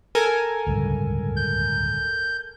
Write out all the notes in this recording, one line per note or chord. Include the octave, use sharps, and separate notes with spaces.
A4 A#4 G#5
D1 C#2 G2
G6